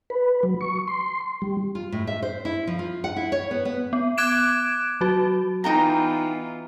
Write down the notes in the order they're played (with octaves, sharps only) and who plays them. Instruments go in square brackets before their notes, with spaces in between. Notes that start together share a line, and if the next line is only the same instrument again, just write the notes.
[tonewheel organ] B4
F#3
C#6
C6
G3
[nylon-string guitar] F4
A2
E5
C5
E4
F3
F4
F#5
E4
C#5
B3
B3
[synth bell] B3
D6 F#6 G#6 D7 E7
F#3 F#4
[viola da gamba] E3 B3 F4 [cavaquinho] D#4 G5 A#5